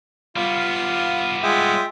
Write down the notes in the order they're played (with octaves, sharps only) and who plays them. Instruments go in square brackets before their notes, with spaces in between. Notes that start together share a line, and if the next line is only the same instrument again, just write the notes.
[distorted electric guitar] G3 B3 [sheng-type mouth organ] F4 F5 C6
[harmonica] G#3 F4 [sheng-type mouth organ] E5 G5